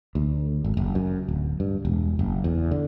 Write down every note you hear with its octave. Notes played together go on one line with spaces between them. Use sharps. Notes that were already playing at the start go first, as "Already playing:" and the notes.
D2
G#1
F#1
F#2
D1
G2
E1
F#1
E2
D3